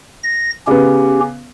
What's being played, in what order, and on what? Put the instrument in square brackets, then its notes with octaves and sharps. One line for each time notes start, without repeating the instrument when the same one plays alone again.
[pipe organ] A#6
[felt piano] C#3 B3 [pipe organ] C#4 G4